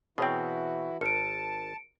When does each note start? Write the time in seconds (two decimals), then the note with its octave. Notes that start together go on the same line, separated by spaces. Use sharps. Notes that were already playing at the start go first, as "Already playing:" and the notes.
0.18 B2 E3 C4 E4 F#4 G#4 C#5 G5
1.01 G#1 A#4 A5 C#7 D7